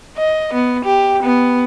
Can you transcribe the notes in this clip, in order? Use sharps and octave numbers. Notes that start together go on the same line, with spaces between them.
D#5
B3
G4
B3